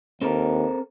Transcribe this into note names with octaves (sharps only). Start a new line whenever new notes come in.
D#2 C4 A4 A#4